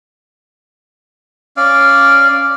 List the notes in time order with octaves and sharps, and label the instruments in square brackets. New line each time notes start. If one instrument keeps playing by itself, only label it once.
[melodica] C#4 D5 F5